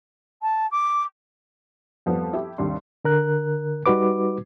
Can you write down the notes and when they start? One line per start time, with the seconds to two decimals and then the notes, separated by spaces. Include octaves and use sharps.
0.42 A5
0.71 D6
2.06 F2 F3 G3 B3
2.33 E4 G4
2.58 D#2 C3 G3 D4 C6
3.05 D3 A#4 F#6
3.86 G3 D#4 F#4 B4 D6